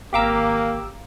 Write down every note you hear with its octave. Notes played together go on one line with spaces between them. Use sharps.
G#1 A#3 G4 F5 A#5 D6 E6